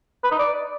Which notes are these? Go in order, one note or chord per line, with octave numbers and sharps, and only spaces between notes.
B4
D#4
D5